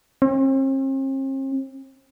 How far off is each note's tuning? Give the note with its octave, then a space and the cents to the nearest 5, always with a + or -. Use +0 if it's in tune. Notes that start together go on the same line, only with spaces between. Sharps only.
C4 +45